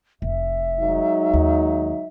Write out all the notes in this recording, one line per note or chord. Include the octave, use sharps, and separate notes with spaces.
F1 E5
F#3 G#3 D#4
D#2